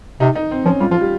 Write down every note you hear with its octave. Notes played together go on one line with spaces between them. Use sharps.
C3 D#4
D#4
C4
F3 C#4
G3 F4
F3 F4
G3